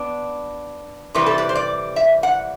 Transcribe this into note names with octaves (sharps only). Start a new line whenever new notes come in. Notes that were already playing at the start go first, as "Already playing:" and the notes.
Already playing: B3 D4
C3 E3 G3 B4
A4
B4
C5
D5
E5
F#5